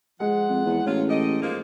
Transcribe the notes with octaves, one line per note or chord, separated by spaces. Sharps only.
F3 G#3 F#5
F2
E2
A1 F#3 F4
G4 A4 D#5
G#2 F3 A#3